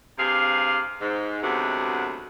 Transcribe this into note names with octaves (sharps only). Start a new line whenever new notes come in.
G2 C3 G4 G#4 F5
G#2
D2 C3 F#3 G#3 A3 B3